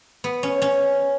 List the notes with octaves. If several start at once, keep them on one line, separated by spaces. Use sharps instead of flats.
B3
C#4
C#4